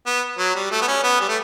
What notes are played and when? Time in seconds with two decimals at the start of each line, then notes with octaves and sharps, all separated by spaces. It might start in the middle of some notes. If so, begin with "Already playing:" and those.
0.06 B3
0.38 F#3
0.55 G3
0.71 A3
0.82 B3
0.88 C#4
1.04 B3
1.21 G3
1.28 A3